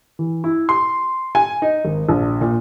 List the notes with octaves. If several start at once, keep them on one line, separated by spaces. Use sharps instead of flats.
E3
E4
C6
G#5
D#4
G#1
A#1
A#2